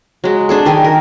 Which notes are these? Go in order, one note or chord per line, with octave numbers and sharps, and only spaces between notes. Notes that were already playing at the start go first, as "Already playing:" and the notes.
F#3 G#3
D4 G#4 A4
D#3 G4 G#5
A#4